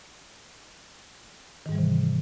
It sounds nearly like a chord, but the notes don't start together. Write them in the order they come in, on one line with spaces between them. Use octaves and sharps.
D#3 G#2 G3 E3 C3